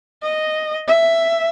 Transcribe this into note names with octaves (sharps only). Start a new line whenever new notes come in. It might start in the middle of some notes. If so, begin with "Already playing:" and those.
D#5
E5